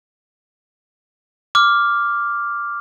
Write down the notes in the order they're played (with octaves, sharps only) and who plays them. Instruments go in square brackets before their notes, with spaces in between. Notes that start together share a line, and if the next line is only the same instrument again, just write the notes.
[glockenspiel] D6 F6